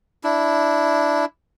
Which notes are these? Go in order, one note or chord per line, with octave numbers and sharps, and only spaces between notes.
D4 E4